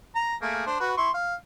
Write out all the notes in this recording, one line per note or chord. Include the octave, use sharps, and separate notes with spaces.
A#5
A3 A#3 G#4
D4 C5
F#4 B4
E4 C6 C#6
F5